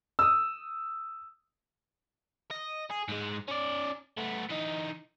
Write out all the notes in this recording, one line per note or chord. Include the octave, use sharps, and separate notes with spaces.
D#6 E6
D#5
G#4
G#2 G#3
C#4 D5
A3 B3
E3 D#4